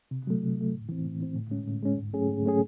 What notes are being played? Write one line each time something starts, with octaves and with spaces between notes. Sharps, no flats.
C3
F#3 A3
C3
F#3 A3
A2
E3 C4
A2
E3 C4
A2
G#3 C#4
A2
G#3 C#4
G#2
F#3 A3 C#4 G#4
G#2
F#3 A3 C#4 G#4